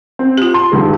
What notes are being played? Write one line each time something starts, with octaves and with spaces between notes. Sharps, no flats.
C4
F4 G4
C6
G2 D#3 G#3